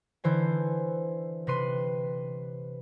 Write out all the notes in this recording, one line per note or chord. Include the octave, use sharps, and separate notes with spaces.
D3 E3 C5 G#5
C3 B4 C6 D#7